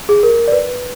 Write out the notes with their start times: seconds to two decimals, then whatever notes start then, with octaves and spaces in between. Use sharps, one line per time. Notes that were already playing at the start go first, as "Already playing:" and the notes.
0.09 G#4
0.23 A#4
0.48 D5
0.52 B4